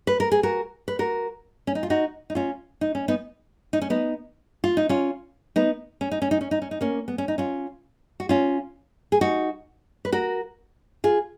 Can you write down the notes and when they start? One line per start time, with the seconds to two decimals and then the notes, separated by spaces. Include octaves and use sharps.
0.07 B4
0.20 A#4
0.32 G#4
0.43 F#4 A#4
0.88 B4
0.99 F#4 A#4
1.67 C#4
1.75 D#4
1.83 F4
1.90 D#4 F#4
2.30 D#4
2.35 C#4 F4
2.81 D#4
2.95 C#4
3.08 B3 D#4
3.73 D#4
3.82 C#4
3.90 B3 D#4
4.64 F4
4.77 D#4
4.89 C#4 F4
5.56 B3 D#4
6.01 C#4
6.11 D#4
6.22 C#4
6.31 D#4
6.41 C#4
6.51 D#4
6.62 C#4
6.71 D#4
6.81 A#3 C#4
7.08 B3
7.18 C#4
7.28 D#4
7.38 C#4 F4
8.20 F#4
8.29 C#4 F4
9.12 G#4
9.21 D#4 F#4
10.05 B4
10.12 F#4 A#4
11.04 F4 G#4